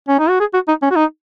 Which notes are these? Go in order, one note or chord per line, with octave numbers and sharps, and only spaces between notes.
C#4
D#4
F#4
G#4
F#4
D#4
C#4
F#4
D#4